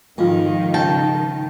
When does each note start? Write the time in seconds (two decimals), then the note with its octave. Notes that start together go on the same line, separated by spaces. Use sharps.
0.18 F2 G#2 D#3 G#3 D#4 F4
0.74 C#3 G5 A5